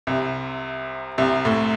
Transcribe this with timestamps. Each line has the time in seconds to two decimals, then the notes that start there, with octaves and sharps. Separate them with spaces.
0.07 C2 C3
1.18 C2 C3
1.45 A2